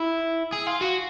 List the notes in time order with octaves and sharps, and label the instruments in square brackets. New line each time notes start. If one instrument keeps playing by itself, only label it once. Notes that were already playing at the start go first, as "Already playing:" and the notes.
Already playing: [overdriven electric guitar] E4
G#4
F4
F#4